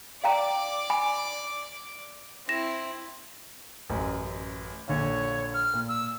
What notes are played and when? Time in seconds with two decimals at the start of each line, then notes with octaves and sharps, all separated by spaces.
0.24 D5 F5 G5 A#5 D6
0.90 G#5 B5
2.49 C4 E4 A#6 E7
3.90 A1 F#2
4.88 A#1 D3 C#5 F5
5.54 F6
5.74 A#2
5.88 E6